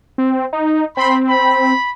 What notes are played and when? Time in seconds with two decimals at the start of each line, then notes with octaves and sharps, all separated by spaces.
0.18 C4
0.53 D#4
0.97 C4 B5 C6
1.29 B5